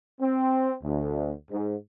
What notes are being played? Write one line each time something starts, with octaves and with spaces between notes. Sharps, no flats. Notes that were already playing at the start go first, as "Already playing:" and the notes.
C4
D2
G#2